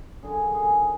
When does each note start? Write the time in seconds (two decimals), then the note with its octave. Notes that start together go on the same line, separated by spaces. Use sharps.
0.22 F#2 D3 F#3 G#4
0.54 G#4